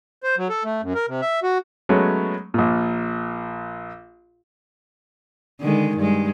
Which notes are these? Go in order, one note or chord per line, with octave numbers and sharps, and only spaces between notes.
C5
F#3
A4
A3
F#2
A#4
C3
E5
F#4
F#3 G#3 A3 B3 C#4
A#1 A#2
D3 D#3 G#3
G2 G#3